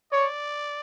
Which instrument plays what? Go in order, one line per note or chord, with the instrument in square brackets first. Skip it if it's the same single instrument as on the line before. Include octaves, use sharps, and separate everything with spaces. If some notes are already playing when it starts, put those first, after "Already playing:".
[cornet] C#5 [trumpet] D5